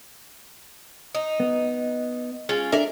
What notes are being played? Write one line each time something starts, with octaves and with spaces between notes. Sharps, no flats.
D#4
B3
G#3 C#4 F4
D4 A4 A#4 D5 E5